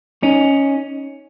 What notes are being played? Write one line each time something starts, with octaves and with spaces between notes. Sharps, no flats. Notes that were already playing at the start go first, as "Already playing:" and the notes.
C#4 D#4